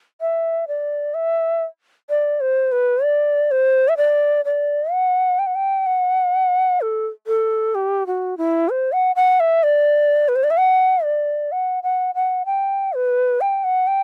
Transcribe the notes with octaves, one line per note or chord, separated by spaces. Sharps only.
E5
D5
E5
D5
C5
B4
D5
C5
E5
D5
D5
F#5
G5
F#5
G5
F#5
A4
A4
G4
F#4
E4
C5
F#5
F#5
E5
D5
B4
C5
D5
E5
F#5
D5
F#5
F#5
F#5
G5
B4
G5
F#5
G5